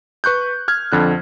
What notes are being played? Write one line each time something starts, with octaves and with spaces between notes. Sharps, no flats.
B4 C#6 F#6 G6
F6 G#6
F2 D3 F#6